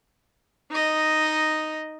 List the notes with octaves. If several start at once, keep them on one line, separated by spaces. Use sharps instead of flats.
D#4 D#5